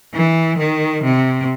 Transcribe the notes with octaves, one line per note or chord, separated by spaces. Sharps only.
E3
D#3
C3